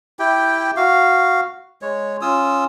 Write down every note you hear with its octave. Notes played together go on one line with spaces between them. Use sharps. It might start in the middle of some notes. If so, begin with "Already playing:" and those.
E4 G4 G5
F#4 F5
G#3 C#5
C#4 F4 D#6 E6